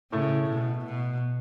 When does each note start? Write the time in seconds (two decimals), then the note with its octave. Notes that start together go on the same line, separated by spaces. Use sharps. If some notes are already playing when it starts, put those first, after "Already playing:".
0.12 A2 C#3 A3
0.49 B2
0.85 B2